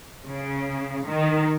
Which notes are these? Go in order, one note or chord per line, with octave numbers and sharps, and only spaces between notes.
C#3
D#3